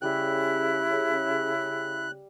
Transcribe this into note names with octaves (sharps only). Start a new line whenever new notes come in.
C#3 G3 E4 G5 F#6